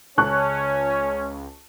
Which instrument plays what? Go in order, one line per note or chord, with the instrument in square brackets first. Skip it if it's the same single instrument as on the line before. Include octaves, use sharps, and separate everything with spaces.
[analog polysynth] C#2 [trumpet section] C#4 C#5 [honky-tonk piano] A5 C#6 F#6